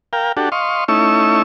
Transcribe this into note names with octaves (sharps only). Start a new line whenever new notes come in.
A#4 F5 G5
D4 F#4 G4 A4
D#5 F5 C6 C#6
A3 C#4 D#4 E4 C#6 E6